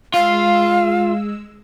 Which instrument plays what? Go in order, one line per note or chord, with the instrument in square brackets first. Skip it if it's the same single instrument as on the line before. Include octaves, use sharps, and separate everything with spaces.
[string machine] G#3 E6 [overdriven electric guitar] F4 [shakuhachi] F5